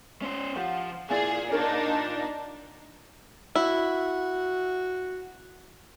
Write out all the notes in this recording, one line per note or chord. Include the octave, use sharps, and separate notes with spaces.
C#4 C5
F3 G4 F#5
A#2 E4 G#4 D5 F5
D4 D#4 A#4 C#5
E4 F#4